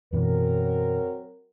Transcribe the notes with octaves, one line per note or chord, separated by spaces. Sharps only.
F#2 B2 E3 F#3 C4 A#4